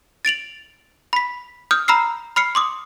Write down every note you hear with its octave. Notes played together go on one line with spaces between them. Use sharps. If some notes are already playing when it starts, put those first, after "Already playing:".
A6 D7 F7 F#7
B5 B6
D#6 F6 G6
A#5 B5 E6 F6 C7
B5 F6 C7 C#7
C6 D6 D#6